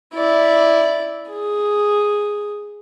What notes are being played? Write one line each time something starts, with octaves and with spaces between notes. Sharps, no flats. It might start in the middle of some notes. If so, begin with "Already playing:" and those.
E4 D5
G#4